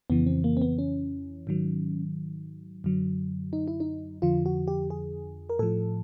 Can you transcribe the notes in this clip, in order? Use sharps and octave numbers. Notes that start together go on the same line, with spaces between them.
F2 C#3 E3 B3
C4
A#3
C4
B3
C#4
G#2 D#3 F#3
F#2 D3 F#3
D#4
E4
D#4
F2 D3 F3 F4
F#4
G4
G#4
A#4
A2 F3 A4